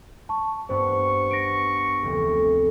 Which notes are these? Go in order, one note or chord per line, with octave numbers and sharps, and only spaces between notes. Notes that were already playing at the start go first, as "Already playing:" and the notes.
A5 C#6
G2 B3 D4 C5 C#6
B3 A#6 D7
F1 D2